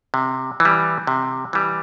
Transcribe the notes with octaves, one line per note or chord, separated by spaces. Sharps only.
C3
E3
G3
C3
E3 G3